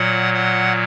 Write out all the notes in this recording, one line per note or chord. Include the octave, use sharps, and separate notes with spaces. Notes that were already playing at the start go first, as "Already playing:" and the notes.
Already playing: A#2 F#3 F#5
F#5